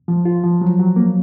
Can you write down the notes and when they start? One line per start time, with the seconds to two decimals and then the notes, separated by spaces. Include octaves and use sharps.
0.08 F3
0.25 F4
0.43 F3
0.61 F#3
0.79 F#3
0.96 A#3